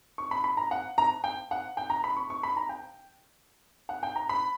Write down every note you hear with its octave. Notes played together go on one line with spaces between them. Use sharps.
C#6
B5
B5
A#5
F#5
A#5
G5
F#5
G5
A#5
B5
C#6
C#6
B5
A#5
G5
F#5
G5
A#5
B5